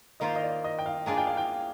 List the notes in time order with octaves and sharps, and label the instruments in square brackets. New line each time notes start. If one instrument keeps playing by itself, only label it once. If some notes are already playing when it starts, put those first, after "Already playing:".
[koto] D#3 A#3 F4 C5 [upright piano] D#5
[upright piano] D#5
D5
D#5
G5
F5
[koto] A#3 D4 F4 G#4 D5 [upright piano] G#5
[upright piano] G5
F5
G5